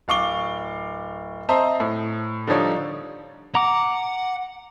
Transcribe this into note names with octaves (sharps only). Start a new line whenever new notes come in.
D1 F5 C#6 D6 G7
C4 C5 D#5 E5 A5 A#5
A2
D3 F3 G3 D#4 C#5 D5
F#5 A#5 D6